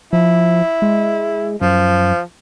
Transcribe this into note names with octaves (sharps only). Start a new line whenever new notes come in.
F3 E4
G#3
F#2 F3